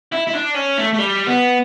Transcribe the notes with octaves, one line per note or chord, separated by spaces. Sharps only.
E4
E4
D4
C#4
A3
A3
G3
B3